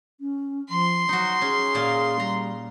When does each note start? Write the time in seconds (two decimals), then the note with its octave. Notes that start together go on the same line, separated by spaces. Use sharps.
0.21 C#4
0.70 F3 C6
1.09 F#3 D#4 F#4
1.41 C#4 G#4
1.75 A#2 A#4 F5
2.20 G3 A#5